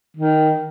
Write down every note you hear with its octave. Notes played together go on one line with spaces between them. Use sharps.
D#3